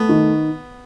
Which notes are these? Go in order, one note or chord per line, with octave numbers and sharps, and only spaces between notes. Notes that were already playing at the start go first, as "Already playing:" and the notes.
Already playing: A3 B3
D#3